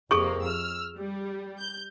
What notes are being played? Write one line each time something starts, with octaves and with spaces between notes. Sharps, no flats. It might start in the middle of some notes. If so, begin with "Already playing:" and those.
F2 C3 A#3 G#4 A4 C#6
E6 F6
G3
G6